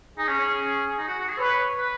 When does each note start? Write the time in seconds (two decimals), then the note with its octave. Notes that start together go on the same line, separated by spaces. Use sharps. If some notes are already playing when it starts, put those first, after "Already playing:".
0.18 D#4 G#4
0.28 C#4
0.39 C#4
0.49 C#4
0.98 D#4
1.08 F#4
1.19 F#4
1.28 G#4
1.38 B4 C#5
1.78 B4